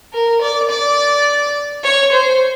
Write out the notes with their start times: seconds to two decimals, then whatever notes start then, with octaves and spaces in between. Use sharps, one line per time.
0.13 A#4
0.41 D5
0.69 D5
1.83 C#5
2.12 C5